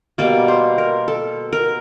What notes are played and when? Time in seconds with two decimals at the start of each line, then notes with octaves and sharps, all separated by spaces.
0.18 B2 G3 A#3 D5
0.48 C5
0.78 A#4
1.08 A4
1.53 A#4